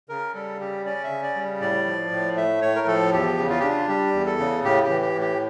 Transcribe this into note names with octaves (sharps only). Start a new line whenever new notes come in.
C#3 A#4
G3 A4
C#3 G4
C#4 D5
E5
C#3
D5
G3
A2 D5
F3
A2
A3 E5
A2 C#5
A#4
F3 A4
E2 G4
C#3
F4
D4 G4
F4
G3 G4
E2
A4
C#3
A2 G4
G4
E3
G4
A2
G4